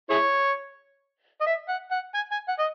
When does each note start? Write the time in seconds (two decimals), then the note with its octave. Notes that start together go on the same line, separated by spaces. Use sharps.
0.10 E4 G#4 C#5
1.41 D#5
1.46 E5
1.69 F#5
1.91 F#5
2.15 G#5
2.32 G#5
2.48 F#5
2.59 D#5